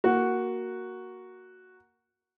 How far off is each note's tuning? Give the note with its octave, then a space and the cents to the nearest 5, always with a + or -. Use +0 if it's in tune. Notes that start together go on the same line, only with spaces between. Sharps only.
A#3 +0 F#4 +0